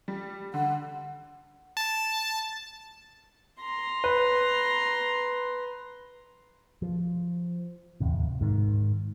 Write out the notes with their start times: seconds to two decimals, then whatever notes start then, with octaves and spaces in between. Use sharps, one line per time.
0.08 G3
0.54 D3 F#5
1.77 A5
3.60 A#5 C6
4.04 B4
6.82 F3
8.00 D1 E2 C3
8.41 G#2 D#3